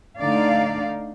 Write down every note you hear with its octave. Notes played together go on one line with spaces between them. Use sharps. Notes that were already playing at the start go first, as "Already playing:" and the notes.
D3 A3 D#4 D5 F5